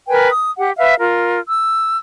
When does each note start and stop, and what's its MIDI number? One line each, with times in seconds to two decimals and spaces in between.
0.08 0.28 70
0.08 0.28 71
0.08 0.28 79
0.08 0.28 80
0.30 0.52 87
0.58 0.71 67
0.58 0.71 78
0.77 0.94 71
0.77 0.94 76
0.77 0.94 77
0.98 1.38 65
0.98 1.38 70
1.48 1.96 88